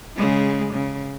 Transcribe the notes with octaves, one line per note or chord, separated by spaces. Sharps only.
C#3 G#3
C#3